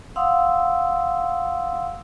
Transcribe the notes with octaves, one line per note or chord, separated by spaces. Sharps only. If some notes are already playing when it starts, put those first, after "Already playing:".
F5 F#5 C6 D#6 E6